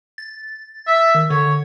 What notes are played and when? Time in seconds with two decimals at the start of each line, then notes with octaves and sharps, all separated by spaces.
0.18 A6
0.87 E5
1.15 D#3
1.30 D3 C#5